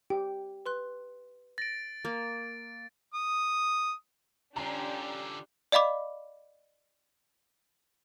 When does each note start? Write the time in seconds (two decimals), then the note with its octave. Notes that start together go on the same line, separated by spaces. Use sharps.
0.10 G4 G5
0.66 B4 C6 F#6
1.58 A6 A#6 D7
2.05 A#3
3.14 D#6
4.56 D3 C#4 D4 F4 G4 A#5
5.72 D5 D#5 F5 B5 D6